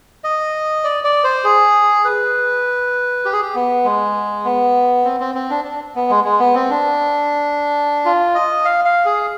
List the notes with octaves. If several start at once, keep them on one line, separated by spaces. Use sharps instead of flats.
D#5
D5
D5
C5
G#4
B4
G4
G#4
G4
B3
G#3
B3
C4
C4
C4
D4
D4
B3
G#3
G#3
B3
C4
D4
F4
D#5
F5
F5
G#4